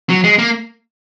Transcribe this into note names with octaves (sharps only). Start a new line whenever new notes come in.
F#3
G#3
A#3